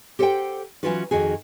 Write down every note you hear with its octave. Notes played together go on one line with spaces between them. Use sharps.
G4 A4 C5 D#5 F#5 G5
E3 F#3 C#4 F4 F#4 B4
F2 D#3 F#4 G#4